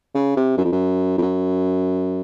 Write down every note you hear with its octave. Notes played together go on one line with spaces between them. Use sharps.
C#3
C3
F#2
F2
F#2
F2
F#2